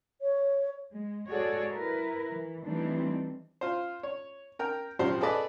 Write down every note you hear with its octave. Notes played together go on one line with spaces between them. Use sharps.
C#5
G#3
G#3 F#4 G#4 A4 C#5 D5
E4 A#4 B4
E3
E3 G3 A3 C4 D4 D#4
F4 C5
C#5
A#4 G5 A#5
A#1 F#2 F3 G4 C5
G#4 A4 B4 D5 D#5 A5